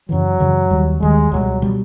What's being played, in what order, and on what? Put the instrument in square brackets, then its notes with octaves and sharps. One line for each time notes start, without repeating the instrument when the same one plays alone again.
[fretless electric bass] F#2 C#3 E3 [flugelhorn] F#3
[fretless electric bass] F#2 C#3 E3
D#2 D#3 G3
[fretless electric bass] D#2 D#3 G3 [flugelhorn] G#3
[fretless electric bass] C#2 B2 G3 [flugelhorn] F#3
[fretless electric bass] B2 G3